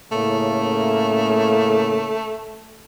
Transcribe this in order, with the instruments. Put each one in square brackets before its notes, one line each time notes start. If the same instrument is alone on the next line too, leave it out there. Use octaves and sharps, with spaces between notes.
[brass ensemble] A2 C#3 A#3 [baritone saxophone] A3